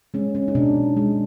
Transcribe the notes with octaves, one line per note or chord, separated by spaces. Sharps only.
G#3 C#4
C#4
D#4
B2 D4
G#3